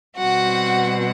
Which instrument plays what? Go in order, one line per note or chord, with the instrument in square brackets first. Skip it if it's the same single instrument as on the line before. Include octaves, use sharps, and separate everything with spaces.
[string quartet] B2 G3 C4 F#4 F#5